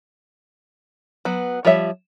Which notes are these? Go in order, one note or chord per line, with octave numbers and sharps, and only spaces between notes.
F#3 B3
F3 G3 C#5 E5